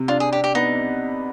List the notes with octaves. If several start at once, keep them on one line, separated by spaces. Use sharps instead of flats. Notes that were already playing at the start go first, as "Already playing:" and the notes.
Already playing: C3
D4 F4
G#4
D4 G4
G4
B3 D#4